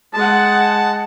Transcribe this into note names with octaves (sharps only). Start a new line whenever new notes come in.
G#3 F#5 A5